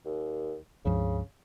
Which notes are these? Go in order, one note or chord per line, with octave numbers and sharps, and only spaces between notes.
D#2
C#2 G2 C#3 F3